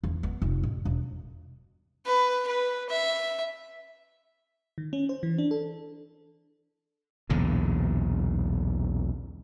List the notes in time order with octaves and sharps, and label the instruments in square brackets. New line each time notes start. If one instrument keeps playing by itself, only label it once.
[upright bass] E2
B3
F1
A1
E1
[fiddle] B4
B4
E5
[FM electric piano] D#3
C#4
C5
E3
D4
A4
[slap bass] B1 E2 A#2 D3